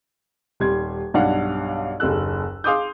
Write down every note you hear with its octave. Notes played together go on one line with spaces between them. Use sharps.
D#1 G3 C6 G#6
B1 G2 D4 F5 F#5
F#1 D#2 G#4 A4 E6 F#6
G#4 F5 C6 D6 D#6 G6